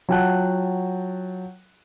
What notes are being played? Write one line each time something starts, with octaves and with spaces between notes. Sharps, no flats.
F#3 F4 F#5 G5 A5 F#6